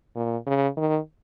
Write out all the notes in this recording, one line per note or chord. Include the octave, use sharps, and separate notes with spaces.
A#2
C#3
D#3